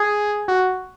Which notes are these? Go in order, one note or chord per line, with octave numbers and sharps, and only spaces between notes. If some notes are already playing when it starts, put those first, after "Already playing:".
Already playing: G#4
F#4